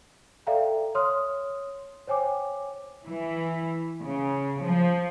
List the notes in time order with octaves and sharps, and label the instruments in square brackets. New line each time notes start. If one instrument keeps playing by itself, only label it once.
[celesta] A4 D5 E5 F5 G5 A#5
C#5 C6 D#6 F6
C5 C#5 G5 G#5 D6
[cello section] E3
C#3
F3